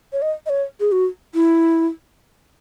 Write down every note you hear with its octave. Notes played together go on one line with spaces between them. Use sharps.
C#5
D#5
D#5
C#5
G#4
F#4
E4